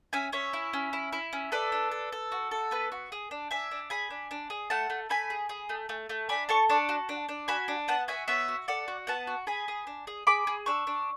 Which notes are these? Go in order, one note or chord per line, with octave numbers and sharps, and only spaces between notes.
C#4 E5 G#5
C#4 C#5 E5
E4
C#4
E4
E4
C#4
A4 B4 D5
D4
A4
A4
F#4
A4
B3 B4
F#4
G#4
D4
D4 E5 G#5
D4
G#4 G#5 B5
D4
D4
G#4
A3 F#5 A5
A3
A3 G#5 B5
G#4
G#4
A3
A3
A3
D4 G#5 B5
A4 A5 C#6
D4 A5 C#6
F#4
D4
D4
F#4 G#5 B5
D4
B3 F#5 A5
F#4 E5 G#5
B3 C#5 E5
F#4
A4 D5 F#5
F#4
B3 F#5 A5
F#4
G#4 G#5 B5
G#4
D4
G#4
G#4 B5 D6
G#4
D4 C#6 E6
D4